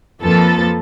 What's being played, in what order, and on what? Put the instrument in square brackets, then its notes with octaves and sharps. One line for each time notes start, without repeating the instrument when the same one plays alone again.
[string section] F2 F3 A#3 A4 B4 A6